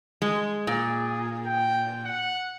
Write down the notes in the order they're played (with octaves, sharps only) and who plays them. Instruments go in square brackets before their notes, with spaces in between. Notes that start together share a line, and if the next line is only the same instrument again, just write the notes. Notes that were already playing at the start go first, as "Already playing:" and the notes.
[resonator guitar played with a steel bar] G#3
[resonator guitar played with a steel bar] A#2 [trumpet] G#4
[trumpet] G5
F#5